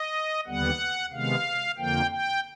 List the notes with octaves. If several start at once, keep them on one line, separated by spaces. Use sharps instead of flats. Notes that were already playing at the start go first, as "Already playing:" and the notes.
Already playing: D#5
D#2 D3 G3 B3 F#5
C3 D#3 G#3 B3 F5
F2 D3 F3 A#3 G5
G5